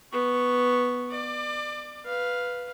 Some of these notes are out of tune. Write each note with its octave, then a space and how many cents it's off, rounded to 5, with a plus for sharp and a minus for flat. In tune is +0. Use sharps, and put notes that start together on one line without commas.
B3 +0 C#6 +0
D5 +30 D6 +15
B4 +0 F5 +0